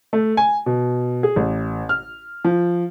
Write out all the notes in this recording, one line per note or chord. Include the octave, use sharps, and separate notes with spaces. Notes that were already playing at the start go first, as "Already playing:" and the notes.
A3
G#5
B2
G#4
A1
F6
F3